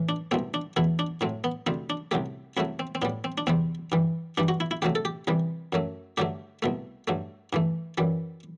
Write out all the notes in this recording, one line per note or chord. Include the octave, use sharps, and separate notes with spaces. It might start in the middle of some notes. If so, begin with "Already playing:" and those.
Already playing: A2 E3
D4
C2 B2 A3 C4
D4
E2 B2 A3 E4
D4
A2 F#3 A3 C4
B3
D2 C3 G3 C4
D4
C2 C3 F#3 A3 G4
C2 C3 F#3 A3 E4
C4
C4
A2 G3 B3
C4
D4
E2 C3 G3 C4
G2 E3 G3
G2 E3 G3 D4
F#4
E4
E4
D2 C3 F#3 A3 G4
A4
G4
C2 C3 E3 G3
F#2 F#3 A3
G2 D3 F#3 A3 G4
C2 B2 A3
G2 F#3 A3
G2 E3 A3
F#2 E3 G3